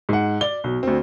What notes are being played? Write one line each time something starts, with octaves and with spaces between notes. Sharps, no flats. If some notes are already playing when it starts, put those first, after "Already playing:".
G#2 F#5
D5 G7
B1
D2 C4